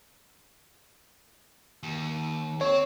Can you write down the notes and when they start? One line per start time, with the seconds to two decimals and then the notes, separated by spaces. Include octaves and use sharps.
1.83 D#2
2.61 C4 C#5